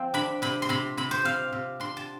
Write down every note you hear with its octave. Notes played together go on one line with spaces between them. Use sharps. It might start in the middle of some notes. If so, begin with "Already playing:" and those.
Already playing: F3 C4
D4 B5
C3 B5
C6
C3 B5
C3 B5
C5
C3 F5
C3
D4 C6
A5